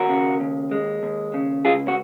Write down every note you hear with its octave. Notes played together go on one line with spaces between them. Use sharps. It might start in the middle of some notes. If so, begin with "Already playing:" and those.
Already playing: D#2 F#4 A#4
C#3
D#2
G#3
D#2
C#3
C#2 F4 G#4
F#4